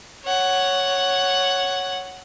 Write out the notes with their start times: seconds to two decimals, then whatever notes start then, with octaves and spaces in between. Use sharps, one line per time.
0.25 C#5 F#5